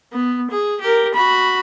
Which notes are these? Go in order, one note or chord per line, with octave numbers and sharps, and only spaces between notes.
B3
G#4
G4 A#4
F#4 B5